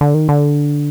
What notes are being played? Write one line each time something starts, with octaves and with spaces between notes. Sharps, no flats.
D3
D#3
D3